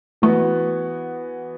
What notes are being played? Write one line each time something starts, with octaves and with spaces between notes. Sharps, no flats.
E3 A3 B3 F#4